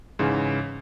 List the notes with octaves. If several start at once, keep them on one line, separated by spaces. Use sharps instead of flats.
G#2 C#3 E3